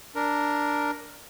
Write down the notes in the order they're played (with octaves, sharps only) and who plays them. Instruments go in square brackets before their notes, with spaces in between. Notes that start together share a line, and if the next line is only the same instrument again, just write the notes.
[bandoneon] D4 A#4